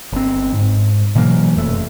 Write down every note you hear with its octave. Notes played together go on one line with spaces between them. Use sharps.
G1 C4
G#2
B2 E3 F#3 A#3
F1 F#2 A3